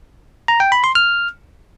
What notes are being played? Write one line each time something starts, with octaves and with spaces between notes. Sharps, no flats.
A#5
G5
B5
C6
F6